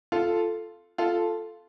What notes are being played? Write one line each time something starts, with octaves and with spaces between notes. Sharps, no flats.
F4 A4
F4 A4